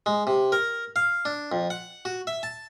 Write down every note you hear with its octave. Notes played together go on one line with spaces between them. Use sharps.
G#3
C3
A#4
F5
D4
F2
F#5
F#4
E5
A5